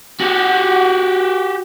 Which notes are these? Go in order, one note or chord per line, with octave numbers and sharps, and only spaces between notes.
F#4 G4